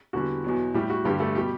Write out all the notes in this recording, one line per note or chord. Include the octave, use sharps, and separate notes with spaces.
E2 D3 G3 F#4
E2 B2 F#3
A2 G3 G4
F#4
G2 D3 G3 G4
A3 A4
B2 G3 G4